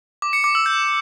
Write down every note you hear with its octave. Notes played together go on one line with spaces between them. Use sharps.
D6
C#7
D6
E6
G6